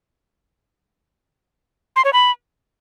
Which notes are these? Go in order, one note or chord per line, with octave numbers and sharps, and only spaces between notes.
C6
C#5
B5